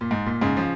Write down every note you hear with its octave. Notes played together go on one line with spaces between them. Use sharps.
A#2
G#2
A#2
G#2 C#3
C#3 F3